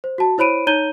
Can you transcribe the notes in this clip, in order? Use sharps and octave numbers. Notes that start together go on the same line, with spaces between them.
C5
F#4 A5
E4 C5 C#5 B5 D7 D#7
D#4 C#5 A#5 G6 D#7 G7